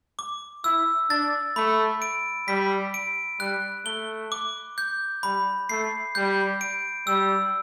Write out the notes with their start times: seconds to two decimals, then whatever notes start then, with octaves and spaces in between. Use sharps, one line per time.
0.19 D6
0.64 E4 E6
1.10 D4 A6
1.56 A3 B5
2.02 D7
2.48 G3 B6
2.94 D7
3.40 G3 F#6
3.85 A3 G7
4.32 D6
4.78 G6
5.23 G3 B5
5.69 A3 C7
6.15 G3 G6
6.61 D7
7.07 G3 E6